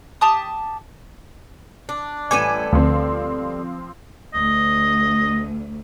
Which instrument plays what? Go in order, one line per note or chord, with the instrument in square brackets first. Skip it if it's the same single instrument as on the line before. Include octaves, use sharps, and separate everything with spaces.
[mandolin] G4 A5 D#6
[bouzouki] D4
[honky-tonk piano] A1 D6 [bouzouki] G3 B3 A4 [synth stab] G#5
[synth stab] D2 [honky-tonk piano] F3 C4
[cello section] D2 [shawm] D#5